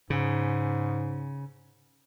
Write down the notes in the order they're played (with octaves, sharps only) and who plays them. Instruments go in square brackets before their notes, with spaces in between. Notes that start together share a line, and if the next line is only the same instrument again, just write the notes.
[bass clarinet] G#2 [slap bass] C#3